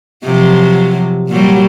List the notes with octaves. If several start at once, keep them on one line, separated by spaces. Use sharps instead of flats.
C3 F3 F#3
A#2 F#3 G3